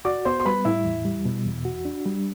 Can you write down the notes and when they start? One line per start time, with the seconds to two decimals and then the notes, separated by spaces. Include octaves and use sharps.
0.05 F#4 D5 D6
0.25 B3 C5 C6
0.40 C6
0.45 G3 B4 B5
0.65 A2 E4 E5
0.85 E2
1.05 G3
1.25 B2
1.46 E2
1.65 F#4
1.85 D4
2.05 G3